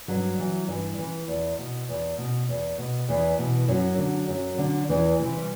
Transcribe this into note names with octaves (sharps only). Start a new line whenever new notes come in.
G2 F#3
E3
G2 E3
E3
E2
B2
E2
B2
E2
B2
E2 E3
B2
F#2 F#3
D3
F#2
D3
E2 E3
C3 E3
G3